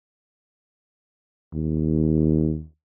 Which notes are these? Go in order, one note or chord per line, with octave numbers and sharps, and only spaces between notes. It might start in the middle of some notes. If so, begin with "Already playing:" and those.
D#2